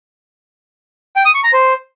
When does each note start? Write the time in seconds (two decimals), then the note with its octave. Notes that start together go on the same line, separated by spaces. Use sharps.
1.16 G5
1.25 D#6
1.35 C#6
1.44 A#5
1.53 C5